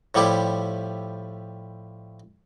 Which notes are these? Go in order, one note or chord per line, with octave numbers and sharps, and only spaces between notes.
A2 F3 G3 E4 G4